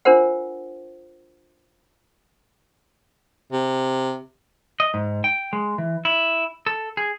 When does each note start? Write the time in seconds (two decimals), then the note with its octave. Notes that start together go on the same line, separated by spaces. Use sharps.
0.05 D4 F4 A#4 C5 F#5
3.52 C3
4.80 D#5
4.94 G#2
5.24 G5
5.53 G#3
5.78 E3
6.05 E4
6.66 A4
6.97 G#4